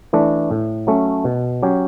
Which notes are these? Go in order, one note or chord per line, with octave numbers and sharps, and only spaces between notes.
E3 A3 D4
A2
F#3 A3 C#4
B2
F#3 C#4 G4 C#5